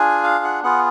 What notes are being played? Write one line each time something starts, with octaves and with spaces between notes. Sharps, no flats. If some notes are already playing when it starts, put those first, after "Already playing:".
Already playing: D4 F4 G#4 G#5
F5
F#5
B3 F4 G#4 F#5